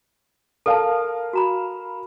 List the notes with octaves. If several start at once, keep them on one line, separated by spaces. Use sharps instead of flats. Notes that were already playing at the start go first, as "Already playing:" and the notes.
A4 A#4 F5 A5
F#4 A#5 B5